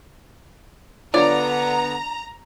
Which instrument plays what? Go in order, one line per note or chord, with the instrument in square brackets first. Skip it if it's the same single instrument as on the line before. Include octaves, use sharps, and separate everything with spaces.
[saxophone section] D3 B3 [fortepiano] D4 F4 C#5 [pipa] D5 [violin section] A#5